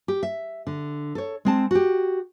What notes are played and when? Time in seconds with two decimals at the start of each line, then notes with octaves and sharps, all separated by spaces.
0.08 G4
0.23 E5
0.67 D3
1.15 A4 C#5
1.45 G#3 C4 A5
1.71 F#4 G4